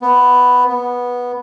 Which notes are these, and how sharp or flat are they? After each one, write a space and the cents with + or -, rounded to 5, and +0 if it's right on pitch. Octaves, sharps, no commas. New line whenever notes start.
B3 +5
B3 -10